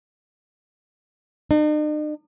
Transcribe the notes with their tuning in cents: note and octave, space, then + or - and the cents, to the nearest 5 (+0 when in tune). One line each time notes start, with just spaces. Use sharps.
D#4 -45